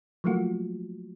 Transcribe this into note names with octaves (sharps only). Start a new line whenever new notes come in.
F3 F#3 A3 A#3 F4 F#4